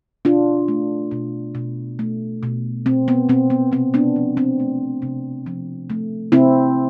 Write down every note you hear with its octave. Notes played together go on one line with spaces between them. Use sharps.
B2 D4 F4
A3
B2
B2
A3
B2
B2 C4
B3
B2 C4
B3
C3 C4
B3 D4
F3
C4
A3
C3
F3
A3
C3 C4 E4